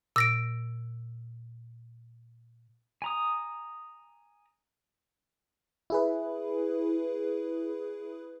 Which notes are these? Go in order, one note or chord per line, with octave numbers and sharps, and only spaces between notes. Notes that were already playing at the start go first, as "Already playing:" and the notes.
A#2 E6 A#6 D7
G#5 A#5 D#6
E4 G#4 B4